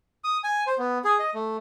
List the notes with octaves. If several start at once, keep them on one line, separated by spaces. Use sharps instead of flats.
D#6
G#5
C5
B3
G#4
D#5
A3